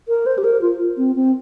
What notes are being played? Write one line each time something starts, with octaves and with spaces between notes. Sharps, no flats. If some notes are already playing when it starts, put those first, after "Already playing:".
A#4
C5
G4
A#4
F4
C4
C4